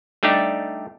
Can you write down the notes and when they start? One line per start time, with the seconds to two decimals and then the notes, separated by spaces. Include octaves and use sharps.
0.23 G3 A3 D4 D#4 G4